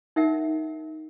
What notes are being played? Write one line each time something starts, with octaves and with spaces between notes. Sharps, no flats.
D#4 A#4 E5 F#5